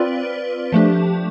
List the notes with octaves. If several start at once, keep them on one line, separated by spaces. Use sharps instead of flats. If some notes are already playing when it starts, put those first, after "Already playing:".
Already playing: C4 F4 B4 D5
F3 A3 D4 G4